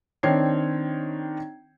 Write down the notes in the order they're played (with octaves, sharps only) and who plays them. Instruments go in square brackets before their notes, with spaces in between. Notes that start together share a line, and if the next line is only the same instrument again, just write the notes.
[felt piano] D#3 C4 D4 C#5 G#6 C7